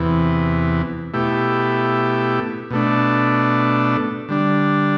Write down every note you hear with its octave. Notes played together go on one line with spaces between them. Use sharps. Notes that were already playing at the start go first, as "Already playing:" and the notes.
Already playing: E2 C3 E3 B3
B2 A3 E4 G4
B2 A3 D4
D3 G3 D4